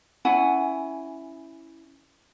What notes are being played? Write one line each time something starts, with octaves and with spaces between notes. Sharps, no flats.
C#4 E4 F#5 G#5